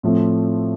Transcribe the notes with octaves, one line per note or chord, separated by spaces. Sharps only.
A2 F3 A3 C4